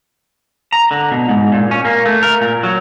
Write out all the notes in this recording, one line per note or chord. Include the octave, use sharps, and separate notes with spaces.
A#5
D3
B2
G#2
A#2
C#4
A#3
A3
A#4
A#2
F#3